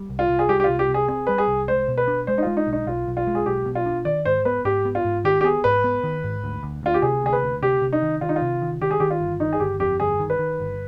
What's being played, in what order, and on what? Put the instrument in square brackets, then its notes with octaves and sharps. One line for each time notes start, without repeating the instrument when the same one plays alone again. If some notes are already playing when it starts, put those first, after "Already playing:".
Already playing: [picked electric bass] G3
C2
[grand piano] F4
[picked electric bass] C2
[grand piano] G#4
[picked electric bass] G3 [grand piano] G4
[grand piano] G4
[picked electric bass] C2 [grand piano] F4
[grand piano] G4
[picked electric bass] C3
[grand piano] G#4
[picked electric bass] C4 [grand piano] G#4
[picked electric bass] G3 [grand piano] B4
[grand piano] G#4
[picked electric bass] C2
[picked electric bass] G#3 [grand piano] C5
[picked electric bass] B2
[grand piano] B4
[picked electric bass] D4
[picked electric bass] G#3 [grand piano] C5
[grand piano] D#4
[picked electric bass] G#3 [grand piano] F4
[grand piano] D#4
[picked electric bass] B1
[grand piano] D#4
[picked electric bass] B1 [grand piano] F4
[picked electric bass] B1
[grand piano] F4
[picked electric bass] G#3
[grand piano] G#4
[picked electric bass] B1 [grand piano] G4
[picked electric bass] B2
[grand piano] F4
[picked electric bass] D4
[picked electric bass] D#3 [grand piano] D5
[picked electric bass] G#2 [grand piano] C5
[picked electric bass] B3 [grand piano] B4
[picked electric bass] G#2 [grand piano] G4
[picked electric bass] B3
[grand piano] F4
[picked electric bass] G#2
[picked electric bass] D#3 [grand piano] G4
[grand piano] G4
[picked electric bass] B3 [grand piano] G#4
[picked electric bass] G#2 [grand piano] B4
[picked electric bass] B3
D#3
G#2
D2
D2
[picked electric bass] D2 [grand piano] F4
[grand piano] G4
[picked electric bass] C3 [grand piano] G#4
[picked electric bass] D2 [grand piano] G#4
[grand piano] B4
[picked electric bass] D2
[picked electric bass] C3 [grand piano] G4
[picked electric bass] C3
[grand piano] D#4
[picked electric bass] D#3
[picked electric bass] D#3 [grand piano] F4
[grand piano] D#4
F4
[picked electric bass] C3
D#3
[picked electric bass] D#3 [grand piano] G4
[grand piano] G#4
[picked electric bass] D#3 [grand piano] G4
[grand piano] F4
[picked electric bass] G1
[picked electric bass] D#3 [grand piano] D#4
[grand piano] G#4
[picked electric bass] G1 [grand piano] G4
[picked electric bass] F2 [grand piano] G4
[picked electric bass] G1 [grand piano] G#4
[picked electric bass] D#3
[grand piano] B4
[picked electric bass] D#3
G1